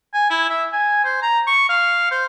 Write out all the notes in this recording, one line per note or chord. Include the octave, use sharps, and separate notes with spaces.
G#5
E4
E5
G#5
C5
A#5
C#6
F5
C5